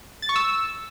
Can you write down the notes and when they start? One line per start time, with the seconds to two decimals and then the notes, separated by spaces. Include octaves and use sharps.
0.22 A6
0.29 C#6
0.36 E6